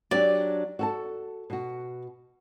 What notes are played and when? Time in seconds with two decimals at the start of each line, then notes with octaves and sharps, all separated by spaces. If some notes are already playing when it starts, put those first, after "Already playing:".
0.11 F#3 D4 G4 D5
0.79 F#4 A4 A5
1.50 B2 F#4